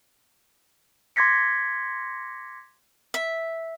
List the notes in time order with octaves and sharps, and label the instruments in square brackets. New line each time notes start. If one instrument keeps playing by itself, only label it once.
[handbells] C6 D6 G#6 A#6 B6 C#7
[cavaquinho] E5